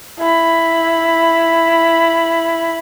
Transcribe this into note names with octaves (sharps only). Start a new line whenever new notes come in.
E4 B5